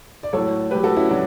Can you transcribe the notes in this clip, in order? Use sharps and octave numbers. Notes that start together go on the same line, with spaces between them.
D5
A2 F#3 A4 C#5
A2 F#3 G4 B4
F#4 A4
C#4 E4
A2 F#3 D4 F#4